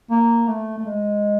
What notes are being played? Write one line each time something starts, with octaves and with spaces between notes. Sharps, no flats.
A#3
A3
A3
G#3